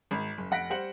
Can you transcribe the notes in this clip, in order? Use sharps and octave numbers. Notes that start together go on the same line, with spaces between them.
G#1
F#1
F1 F#5 A#6 B6 D7
G3 C5 F#5 C#7 F#7